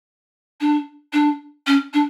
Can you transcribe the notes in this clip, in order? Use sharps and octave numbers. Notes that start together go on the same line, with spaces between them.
D4
D4
C#4
D4